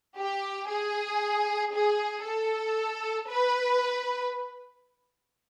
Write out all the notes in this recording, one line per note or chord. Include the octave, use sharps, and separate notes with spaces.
G4
G#4
G#4
A4
B4